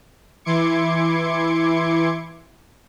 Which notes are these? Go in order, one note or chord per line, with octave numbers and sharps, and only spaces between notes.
E3 E4 C6 D6 G#6 C#7